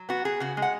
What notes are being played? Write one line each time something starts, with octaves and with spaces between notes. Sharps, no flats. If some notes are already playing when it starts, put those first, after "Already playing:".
Already playing: F#3
B3 F#4
B3 G#4
C#3 F#4
G#3
F#5